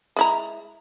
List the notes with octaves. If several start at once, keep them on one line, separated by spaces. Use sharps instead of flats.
G#3 E4 A#5